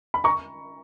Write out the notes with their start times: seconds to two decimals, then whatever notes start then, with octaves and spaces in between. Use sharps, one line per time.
0.14 B5
0.24 A#5 C#6